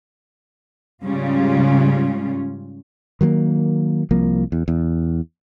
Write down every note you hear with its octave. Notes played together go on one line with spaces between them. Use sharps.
G#2 C#3 G3 C#4 F4
D#3 F#3 G3 A#3
C2 F3 A#3
E2
E2